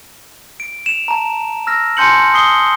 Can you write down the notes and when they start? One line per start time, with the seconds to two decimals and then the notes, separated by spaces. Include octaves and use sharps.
0.60 D7
0.86 E7 F7
1.08 A5 A#5
1.67 E6 F6 A#6
1.97 G#5 A5 C6 G6 C#7 F#7
2.34 D#6 C7 G7